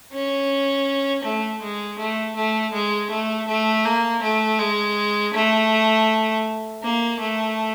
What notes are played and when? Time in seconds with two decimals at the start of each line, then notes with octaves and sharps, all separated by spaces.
0.12 C#4
1.24 A3
1.61 G#3
1.99 A3
2.36 A3
2.73 G#3
3.10 A3
3.48 A3
3.85 A#3
4.22 A3
4.59 G#3
5.34 A3
6.82 A#3
7.20 A3